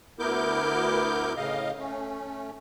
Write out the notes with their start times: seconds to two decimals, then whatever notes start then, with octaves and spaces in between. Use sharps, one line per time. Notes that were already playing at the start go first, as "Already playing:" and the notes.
0.19 D2 B3 E4 A#4 D6 G6
1.37 A2 C#3 D#5 F5
1.79 A3 C#4